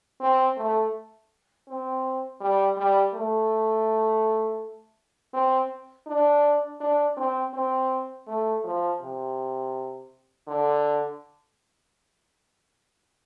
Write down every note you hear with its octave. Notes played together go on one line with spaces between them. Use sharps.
C4
A3
C4
G3
G3
A3
C4
D4
D4
C4
C4
A3
F3
C3
D3